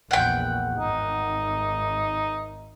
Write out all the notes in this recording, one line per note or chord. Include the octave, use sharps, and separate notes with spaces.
A#1 E2 F#5 G5
G#1 D#4